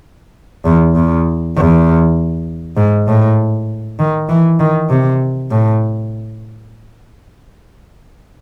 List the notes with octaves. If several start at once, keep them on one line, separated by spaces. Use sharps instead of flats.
E2
E2
E2
G#2
A2
D#3
E3
D#3
C3
A2